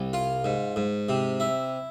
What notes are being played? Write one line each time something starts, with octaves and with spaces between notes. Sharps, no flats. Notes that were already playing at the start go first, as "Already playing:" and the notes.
Already playing: C2
F4
G#2
G#2
C3
E4